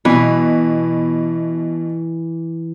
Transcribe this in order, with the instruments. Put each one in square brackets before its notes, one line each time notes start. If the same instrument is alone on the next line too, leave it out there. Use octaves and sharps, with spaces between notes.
[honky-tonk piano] B2 [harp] E3